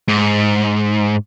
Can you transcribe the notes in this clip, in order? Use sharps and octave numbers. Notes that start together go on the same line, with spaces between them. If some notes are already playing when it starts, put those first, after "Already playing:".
G#2